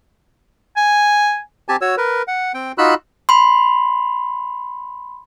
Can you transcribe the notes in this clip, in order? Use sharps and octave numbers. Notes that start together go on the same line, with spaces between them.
G#5
C4 G4 G#5 A5
F#4 C#5 E6
A#4 B4
F#5
C4 G5
D#4 F4 F#4 B5 E6 F#6
B5 C6